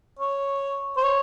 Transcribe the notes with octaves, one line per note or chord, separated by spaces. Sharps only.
C#5
C5
C#5